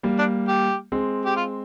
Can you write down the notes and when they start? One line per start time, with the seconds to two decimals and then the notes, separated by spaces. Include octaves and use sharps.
0.03 G3 A#3
0.19 D4
0.48 G4
0.92 G#3 C4
1.26 G4
1.37 F4